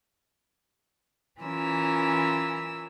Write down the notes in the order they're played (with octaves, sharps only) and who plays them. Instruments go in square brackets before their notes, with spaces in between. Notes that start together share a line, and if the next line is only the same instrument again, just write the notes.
[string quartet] E3 C#4 F4 A#4 E6